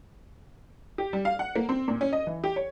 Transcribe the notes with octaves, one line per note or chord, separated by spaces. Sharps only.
G4
G3
F5
F#5
A#3
C4
A#2
C#4
D#5
E3
G4
C#5